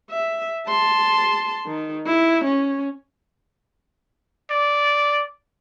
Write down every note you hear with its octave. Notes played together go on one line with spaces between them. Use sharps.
E5
A5 C6
D#3
E4
C#4
D5